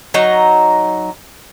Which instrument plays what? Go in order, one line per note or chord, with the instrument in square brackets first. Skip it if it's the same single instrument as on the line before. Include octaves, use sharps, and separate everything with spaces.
[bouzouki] F#3 D#4 A#5